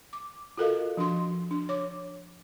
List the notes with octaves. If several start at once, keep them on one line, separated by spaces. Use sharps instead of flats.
D6
F4 F#4 A4 A#4 D#5 F5
F3 D4 F#4 C6
D4
C#5 D6